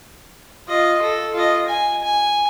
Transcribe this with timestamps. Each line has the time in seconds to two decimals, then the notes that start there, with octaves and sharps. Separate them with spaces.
0.68 F4 D#5
1.02 A4
1.34 F4 D#5
1.68 G#5
2.03 G#5